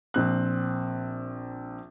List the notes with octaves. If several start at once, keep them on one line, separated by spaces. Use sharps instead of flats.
A#1 C4 F#6